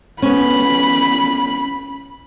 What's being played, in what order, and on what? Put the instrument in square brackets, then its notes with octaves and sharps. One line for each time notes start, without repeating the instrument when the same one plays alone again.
[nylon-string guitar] B3 C#4 [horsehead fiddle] B5